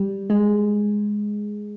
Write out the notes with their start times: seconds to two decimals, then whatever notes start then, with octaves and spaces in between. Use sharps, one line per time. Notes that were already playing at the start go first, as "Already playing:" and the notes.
Already playing: G3
0.30 G#3